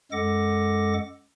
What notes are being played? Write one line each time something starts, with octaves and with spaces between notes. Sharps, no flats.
F#2 G#3 A4 F#5 D6 A#6